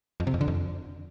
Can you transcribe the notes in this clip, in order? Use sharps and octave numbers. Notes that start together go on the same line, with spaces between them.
F2
C3
F2
D3
F2